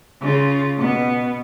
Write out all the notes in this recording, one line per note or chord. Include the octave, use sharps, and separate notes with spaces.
C#3 F4
B2 B3